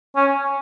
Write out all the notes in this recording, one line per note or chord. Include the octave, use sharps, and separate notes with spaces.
C#4